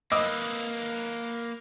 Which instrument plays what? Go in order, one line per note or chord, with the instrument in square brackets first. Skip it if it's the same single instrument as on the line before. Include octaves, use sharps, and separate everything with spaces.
[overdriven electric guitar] A#3 B4 [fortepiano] D#5 D6 E6